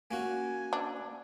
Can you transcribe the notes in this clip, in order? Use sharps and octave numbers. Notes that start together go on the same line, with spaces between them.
A#3 C#4 F#4 G#5
D4